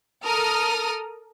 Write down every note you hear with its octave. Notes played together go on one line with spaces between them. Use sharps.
A4 A#4 D#6 F6